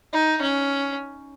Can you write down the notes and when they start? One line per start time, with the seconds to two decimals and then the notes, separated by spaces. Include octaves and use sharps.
0.13 D#4
0.42 C#4